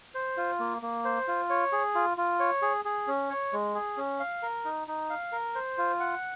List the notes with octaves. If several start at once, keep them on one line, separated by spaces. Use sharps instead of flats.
C5
F4
A#3
A#3
C5
F4
C#5
G#4
F4
F4
C#5
G#4
G#4
C#4
C#5
G#3
G#4
C#4
F5
A#4
D#4
D#4
F5
A#4
C5
F4
F#5